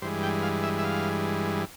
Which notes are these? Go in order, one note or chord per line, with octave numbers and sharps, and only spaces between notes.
G2 E3 G#3 C5
G5
F5
E5
E5
F5